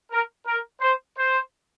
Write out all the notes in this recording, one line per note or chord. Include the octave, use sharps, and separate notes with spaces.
A#4
A#4
C5
C5